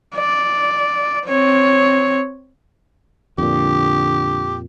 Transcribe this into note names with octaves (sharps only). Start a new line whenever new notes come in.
D5
C4 C#5
F2 A#2 D3 G4